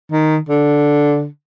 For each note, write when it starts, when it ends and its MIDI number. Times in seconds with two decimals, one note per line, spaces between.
0.12 0.38 51
0.49 1.27 50